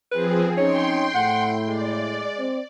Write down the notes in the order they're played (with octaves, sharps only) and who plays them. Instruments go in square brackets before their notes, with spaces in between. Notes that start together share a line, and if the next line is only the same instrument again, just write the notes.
[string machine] F3 C4 G#4 [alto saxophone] B4
[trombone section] C#4 D#4 [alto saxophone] C#5 [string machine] G5 C6
[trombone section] A2 E4 [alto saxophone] F#5
[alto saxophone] G#3 [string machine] D5
[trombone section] C4